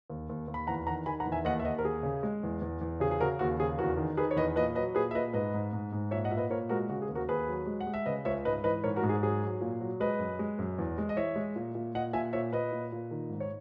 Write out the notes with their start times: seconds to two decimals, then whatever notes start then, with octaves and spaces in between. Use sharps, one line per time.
0.10 D#2
0.29 D#2
0.48 D#2
0.54 B5
0.67 E2 F#5 A#5
0.87 D#3 F#5 A#5
1.06 D#3 G#5 B5
1.20 F#5 A#5
1.26 E2
1.32 E5 G#5
1.45 D#2 D#5 F#5
1.59 E5
1.65 D#2 D#5 F#5
1.79 A#4
1.84 D#2 G#4
2.03 C#3
2.23 G#3
2.43 E2
2.62 E2
2.81 E2
3.00 C#3 G#4
3.11 G#4
3.21 C#3 F#4 A#4
3.39 D#2 F#4
3.60 C#3 G#4
3.78 E2 F#4 A#4
3.97 D#3
4.17 D#3 G#4 B4
4.31 C#5
4.36 E2 B4 D#5
4.56 A#2 B4 D#5
4.75 F#3 B4 D#5
4.95 A#2 G#4 B4
5.11 E5
5.15 A#2 B4 D#5
5.33 G#2 B4 D#5
5.54 G#2
5.73 G#2
5.92 G#2
6.11 A#2 C#5 E5
6.24 D#5 F#5
6.31 A#2 E5
6.37 B4 D#5
6.50 A#2 A#4 C#5
6.69 G#3 F#4 A#4
6.89 C#3 F#4
7.02 G#4
7.09 D#2
7.15 F#4 A#4
7.28 D#2 G#4 B4
7.48 F#3
7.67 G#3
7.81 F#5
7.87 G#3
7.94 E5
8.06 C#3 B4 D#5
8.25 C#2 C#5 E5
8.45 G#2 B4 D#5
8.64 E3 B4 D#5
8.83 G#2 A#4 C#5
8.96 F#4 A#4
9.03 G#2
9.09 G#4
9.22 F#3 G#4
9.42 F#3
9.61 A#2
9.80 F#3
10.00 G#3 B4 D#5
10.19 F#2
10.39 G#3
10.58 F#2
10.78 E2
10.98 G#3
11.09 D#5
11.16 E3 C#5 E5
11.36 G#3
11.56 A#2
11.75 A#2
11.95 A#2 D#5 F#5
12.13 A#2 E5 G#5
12.33 A#2 C#5 E5
12.53 A#2 B4 D#5
12.72 A#2
12.92 A#2
13.11 D#3
13.30 G#2
13.40 C#5